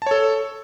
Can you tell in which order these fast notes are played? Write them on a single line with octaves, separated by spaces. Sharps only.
A5 C#5 A4